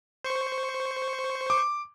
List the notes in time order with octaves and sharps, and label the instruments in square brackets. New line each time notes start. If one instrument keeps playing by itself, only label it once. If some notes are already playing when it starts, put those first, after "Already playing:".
[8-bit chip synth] C5 C#6
[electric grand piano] D6